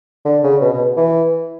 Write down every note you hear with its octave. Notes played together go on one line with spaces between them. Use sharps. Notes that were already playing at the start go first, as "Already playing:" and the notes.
D3
C#3
B2
B2
E3